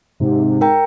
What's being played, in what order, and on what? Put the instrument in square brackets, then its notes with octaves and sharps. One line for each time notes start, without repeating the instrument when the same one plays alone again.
[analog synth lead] G#2 [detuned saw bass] C3
[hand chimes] A#4 G5 A#5